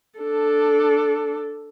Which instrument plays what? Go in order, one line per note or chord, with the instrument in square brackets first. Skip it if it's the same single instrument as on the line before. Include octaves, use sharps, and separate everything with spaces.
[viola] D4 A4